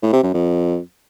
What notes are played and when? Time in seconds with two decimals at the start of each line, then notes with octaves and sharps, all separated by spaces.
0.02 A2
0.13 C3
0.23 F#2
0.34 F2